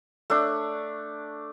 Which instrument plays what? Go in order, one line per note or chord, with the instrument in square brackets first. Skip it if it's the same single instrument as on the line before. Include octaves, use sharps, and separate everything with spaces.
[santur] A3 D4